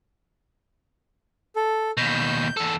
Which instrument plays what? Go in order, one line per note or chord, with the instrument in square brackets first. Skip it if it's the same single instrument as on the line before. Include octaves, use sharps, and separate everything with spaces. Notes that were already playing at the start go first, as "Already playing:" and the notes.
[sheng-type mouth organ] A4
[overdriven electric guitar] D#2 B2 [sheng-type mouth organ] G6
[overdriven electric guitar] E2 A4